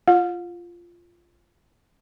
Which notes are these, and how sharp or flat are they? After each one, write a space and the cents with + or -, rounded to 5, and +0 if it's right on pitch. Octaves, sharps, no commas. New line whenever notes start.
F4 -10 F5 +45